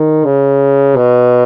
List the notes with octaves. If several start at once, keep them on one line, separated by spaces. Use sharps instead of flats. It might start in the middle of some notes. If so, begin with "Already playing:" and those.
Already playing: D#3
C#3
B2